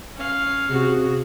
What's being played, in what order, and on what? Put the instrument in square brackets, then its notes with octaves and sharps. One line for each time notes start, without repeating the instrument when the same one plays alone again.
[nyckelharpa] C#4 F5
[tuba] C3 [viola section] F#4 [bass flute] G#4